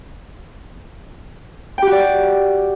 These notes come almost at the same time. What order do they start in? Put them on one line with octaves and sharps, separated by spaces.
G5 G4 F#4 D5